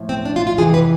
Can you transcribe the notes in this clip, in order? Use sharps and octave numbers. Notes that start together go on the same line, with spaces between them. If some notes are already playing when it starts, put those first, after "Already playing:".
Already playing: A2 F3
C4
D4
F4
F4
F2 C3 E3 G#4
B4